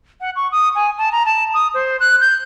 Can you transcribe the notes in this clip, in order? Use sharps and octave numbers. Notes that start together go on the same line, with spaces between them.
F#5
C#6
D#6
G#5
A5
A#5
A5
D#6
C5
F#6
G6